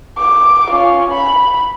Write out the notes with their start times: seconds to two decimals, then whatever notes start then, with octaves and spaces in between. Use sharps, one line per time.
0.18 D6
0.71 C#4 F4
1.11 B5